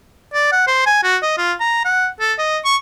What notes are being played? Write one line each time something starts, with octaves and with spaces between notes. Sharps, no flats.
D5
F#5
C5
G#5
F#4
D#5
F4
A#5
F#5
A4
D#5
C#6